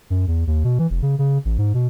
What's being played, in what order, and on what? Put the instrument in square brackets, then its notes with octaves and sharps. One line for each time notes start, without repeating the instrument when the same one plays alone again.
[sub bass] F#2
E2
D#2
B2
E3
F1
C#3
C#3
A1
G#2
B2